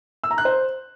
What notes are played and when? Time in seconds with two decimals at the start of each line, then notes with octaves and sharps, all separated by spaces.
0.24 E6
0.31 A#5
0.38 F#6
0.45 C5